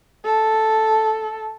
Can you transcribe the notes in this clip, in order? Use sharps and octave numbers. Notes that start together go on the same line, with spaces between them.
A4